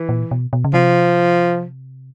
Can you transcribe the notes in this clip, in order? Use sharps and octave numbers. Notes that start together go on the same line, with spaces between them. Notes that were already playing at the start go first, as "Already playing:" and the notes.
Already playing: E3
A#2
B2
B2
C#3
C3 F3